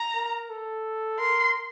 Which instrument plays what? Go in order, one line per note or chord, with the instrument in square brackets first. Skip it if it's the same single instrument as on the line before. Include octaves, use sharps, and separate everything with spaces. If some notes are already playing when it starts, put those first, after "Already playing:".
Already playing: [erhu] A#5
[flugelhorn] A#4
A4
[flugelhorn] A#4 [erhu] C6